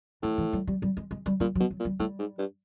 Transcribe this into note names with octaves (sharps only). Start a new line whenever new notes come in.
A2 E3
E3
G3
G3
G3
G#3
G#3
G3
A#2 G3
F#3
B2
F#3
A#2
G3
A2 G3
G#2
G2